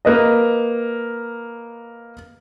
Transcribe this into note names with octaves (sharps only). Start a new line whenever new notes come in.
A#3 B4 D#5